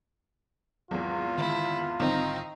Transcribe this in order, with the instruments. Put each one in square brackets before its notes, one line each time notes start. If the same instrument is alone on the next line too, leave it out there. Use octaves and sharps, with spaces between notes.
[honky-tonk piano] G#1 E2 [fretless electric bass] F#3 [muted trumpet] F4
[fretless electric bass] D3 D#3 G#3 [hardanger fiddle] E4
[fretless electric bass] G#1 D3 G3 [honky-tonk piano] D#3 C4 [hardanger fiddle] D#4